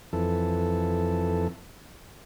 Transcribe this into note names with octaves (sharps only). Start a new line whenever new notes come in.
F2 E3 A4